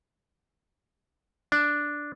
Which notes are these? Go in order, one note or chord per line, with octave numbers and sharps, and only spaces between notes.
D4